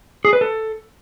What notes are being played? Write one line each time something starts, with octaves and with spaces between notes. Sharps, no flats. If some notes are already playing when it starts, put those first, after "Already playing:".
G#4
B4
A4